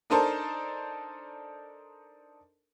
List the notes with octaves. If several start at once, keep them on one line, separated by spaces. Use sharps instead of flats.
D4 D#4 A4 A#4 C5 A5